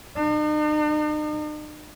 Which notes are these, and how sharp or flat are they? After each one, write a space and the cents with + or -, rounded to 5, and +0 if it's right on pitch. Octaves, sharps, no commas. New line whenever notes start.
D#4 -45